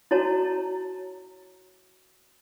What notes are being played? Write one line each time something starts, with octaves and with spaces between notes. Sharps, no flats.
E4 F#4 C#5 A5 A#5